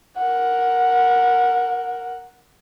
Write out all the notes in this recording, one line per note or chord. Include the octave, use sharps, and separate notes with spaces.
A#4 F#5